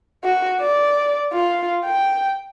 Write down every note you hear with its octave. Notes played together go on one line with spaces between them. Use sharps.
F#4
D5
F4
G5